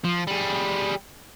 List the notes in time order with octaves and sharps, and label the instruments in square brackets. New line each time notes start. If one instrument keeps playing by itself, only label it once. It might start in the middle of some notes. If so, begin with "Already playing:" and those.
[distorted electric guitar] F3
G3 G#4